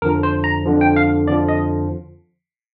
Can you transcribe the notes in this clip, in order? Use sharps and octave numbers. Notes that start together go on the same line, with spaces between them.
F2 D3 F3 A#4
C5
A#5
F2 D3 F3
G5
F5
F2 D3 F3 D5
D#5